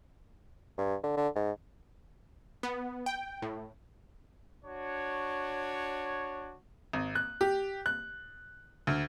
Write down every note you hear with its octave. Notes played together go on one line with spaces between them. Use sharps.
G2
D3
D3
G#2
B3
G5
A2
D4 F#4 C#5
G#1
F#6
G4
F#6
D2